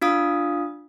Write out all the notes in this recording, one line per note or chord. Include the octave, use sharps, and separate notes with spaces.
D4 F4 F5 D#6